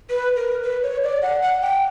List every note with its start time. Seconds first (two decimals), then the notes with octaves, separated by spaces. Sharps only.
0.10 B4
0.36 A#4
0.63 B4
0.83 C#5
1.03 D5
1.22 F#5
1.42 F#5
1.62 G5